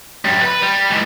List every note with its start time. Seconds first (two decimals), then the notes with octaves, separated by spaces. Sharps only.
0.25 F#2 G3
0.41 B4
0.62 G3
0.91 G#2 E3